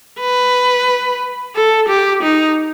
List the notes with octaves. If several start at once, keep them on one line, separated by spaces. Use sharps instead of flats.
B4
A4
G4
D#4